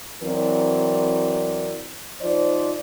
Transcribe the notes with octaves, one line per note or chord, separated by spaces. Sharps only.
E3 F#3 C4 A#4 D5
F3 D#4 C5 D5